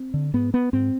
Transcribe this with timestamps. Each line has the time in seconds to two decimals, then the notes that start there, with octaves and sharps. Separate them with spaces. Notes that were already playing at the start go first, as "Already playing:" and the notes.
Already playing: C4
0.14 D3
0.34 G#2 B3
0.54 B3
0.73 G#2 C4